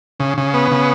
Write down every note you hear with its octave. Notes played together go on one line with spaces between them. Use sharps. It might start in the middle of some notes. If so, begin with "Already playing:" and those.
C#3
C#3
B3
C#3